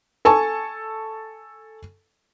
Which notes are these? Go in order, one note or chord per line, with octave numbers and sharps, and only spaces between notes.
A4 G#5 A5 C#6